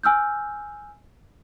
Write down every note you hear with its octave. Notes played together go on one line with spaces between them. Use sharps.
G#5 E6 F6 G6